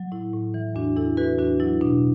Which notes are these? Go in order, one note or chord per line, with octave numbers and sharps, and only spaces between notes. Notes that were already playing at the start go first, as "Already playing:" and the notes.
Already playing: F#3
A2 E4
A2
E3
E2 D4 F#4
E2 E4 A4
E3 F#4 B4
E2 D4 F#4
F#3 E4
B2 D4